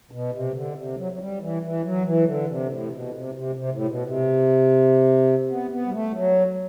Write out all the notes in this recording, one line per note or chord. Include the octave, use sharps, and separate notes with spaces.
B2
C3
D3
C3
F#3
F#3
G3
E3
E3
F#3
E3
D3
C3
A2
C3
B2
C3
C3
C3
A2
B2
C3
B3
B3
G3
A3
F#3